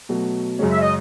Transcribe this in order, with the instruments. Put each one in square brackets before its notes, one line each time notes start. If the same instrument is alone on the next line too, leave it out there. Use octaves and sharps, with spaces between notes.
[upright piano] B2 F#3 A3
F#2 C#3 G#3 C#4 G#4
[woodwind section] E5
D#5